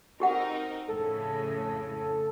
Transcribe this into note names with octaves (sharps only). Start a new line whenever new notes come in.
C4 D#4 F#4 G4 A#4 F#5
F2 A2 C#3 A4